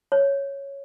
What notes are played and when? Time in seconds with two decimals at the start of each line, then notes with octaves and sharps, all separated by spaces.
0.12 C#5